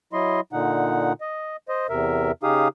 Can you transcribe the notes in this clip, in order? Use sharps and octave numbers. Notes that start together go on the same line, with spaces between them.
F#3 E4 D#5 C6
A#2 D3 D#4 F#5
D#5
C5 D#5
E2 C3 A#4 E5
C#3 D#4 G4 G#4 F5 D#6